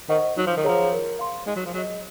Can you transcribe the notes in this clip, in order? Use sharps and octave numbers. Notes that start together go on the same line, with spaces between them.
D#3 C5 D#5 F#5 C#6
F#3 D#4
F3
D#3
F3 G#4 C#5 F#5 A#5
A#4
F5 C6
G#3 D#4
F#3
F3
F#3 G#4 D#5